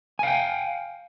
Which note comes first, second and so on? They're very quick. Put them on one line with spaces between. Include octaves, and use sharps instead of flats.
G#5 F5 G5